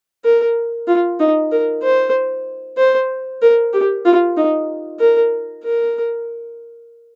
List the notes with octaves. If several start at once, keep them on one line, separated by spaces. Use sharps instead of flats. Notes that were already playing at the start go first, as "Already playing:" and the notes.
A#4
F4
D#4
A#4
C5
C5
A#4
G4
F4
D#4
A#4
A#4